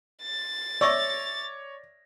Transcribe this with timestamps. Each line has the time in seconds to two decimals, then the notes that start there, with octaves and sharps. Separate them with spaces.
0.24 A6
0.81 C#5 D5 E5 C#6 E6 A#6